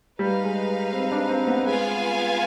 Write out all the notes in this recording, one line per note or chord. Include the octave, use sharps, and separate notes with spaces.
G3 D#4 B4 F5
G#3
C4
D4
C4
B3
G#3 B3 F4 B4 F5 G#5